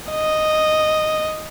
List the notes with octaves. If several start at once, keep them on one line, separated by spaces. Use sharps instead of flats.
D#5